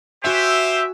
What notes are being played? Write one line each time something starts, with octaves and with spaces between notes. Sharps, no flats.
F#4 G4 C5 E5 F#5 G#5